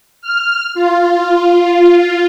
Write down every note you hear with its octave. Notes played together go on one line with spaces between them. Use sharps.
F6
F4